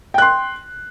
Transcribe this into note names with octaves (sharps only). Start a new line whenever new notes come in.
G5 C6 F#6